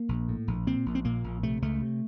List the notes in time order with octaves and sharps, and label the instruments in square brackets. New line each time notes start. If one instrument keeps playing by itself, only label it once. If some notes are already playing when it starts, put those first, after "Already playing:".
Already playing: [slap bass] A#3
A#1
A2
A#1
A#2 C4
A#1
C4
A#2 A#3
A#1
C3 A3
C#2 A3
C3